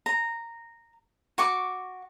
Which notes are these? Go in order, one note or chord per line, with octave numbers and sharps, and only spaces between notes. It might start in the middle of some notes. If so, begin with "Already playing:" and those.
A#5
F#4 C#6 D6